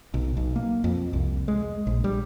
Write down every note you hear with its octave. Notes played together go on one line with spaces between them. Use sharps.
B1
B1
A#3
F2
C2
G#3
A#1
G3